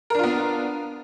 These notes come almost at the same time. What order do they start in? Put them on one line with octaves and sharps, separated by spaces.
A#4 D4 F4 B3